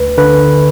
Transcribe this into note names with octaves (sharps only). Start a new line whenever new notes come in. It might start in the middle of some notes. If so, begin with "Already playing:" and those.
Already playing: D2 B4
D3 B4